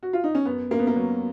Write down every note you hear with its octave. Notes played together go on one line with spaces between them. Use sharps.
F#4
F4
D#4
C#4
F#2 B3
F#2 A#3
B3
A#3
F#3